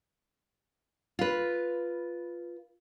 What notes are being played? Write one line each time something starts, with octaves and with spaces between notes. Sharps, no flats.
F4 B4